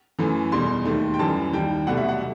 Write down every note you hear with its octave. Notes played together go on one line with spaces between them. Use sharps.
F#2 E3 A3
E2 B2 G3 C6
D#2 D#3 A3
G5
F#2 E3 G3 A5
D#2 D#3 G3 G5
C2 B2 F#3 A3 F#5
E5
F#5